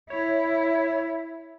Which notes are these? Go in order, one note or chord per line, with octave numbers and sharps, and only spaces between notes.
E4 C#5